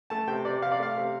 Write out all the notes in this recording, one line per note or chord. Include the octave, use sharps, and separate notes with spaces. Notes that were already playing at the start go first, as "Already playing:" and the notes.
A3 A5
C3 G5
C3 D5
C3 F5
D5
A3 F5
C3